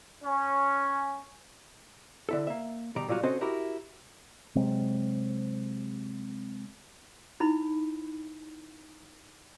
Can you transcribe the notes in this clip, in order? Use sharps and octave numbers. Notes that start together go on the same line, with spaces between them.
C#4
D3 E4 A4
A#3 E5
B2 D#3 G3 D5 A#5
A#2 F#3 G3 F4 F#4
C4 C#4 F#4 A4 C5 D#5
E4 F#4 G4 A#4
C3 F#3 G#3 C4
D#4 E4 B5